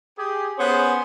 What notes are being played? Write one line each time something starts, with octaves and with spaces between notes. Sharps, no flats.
G4 G#4
B3 C#4 G#4 C5